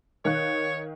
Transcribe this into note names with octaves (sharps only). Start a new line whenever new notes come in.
D#3 C#5 F5 F#6